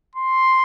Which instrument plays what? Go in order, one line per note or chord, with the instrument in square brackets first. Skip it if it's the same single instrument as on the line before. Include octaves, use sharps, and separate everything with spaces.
[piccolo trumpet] C6